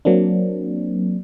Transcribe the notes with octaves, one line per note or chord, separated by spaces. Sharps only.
F#3 A#3 C4 D4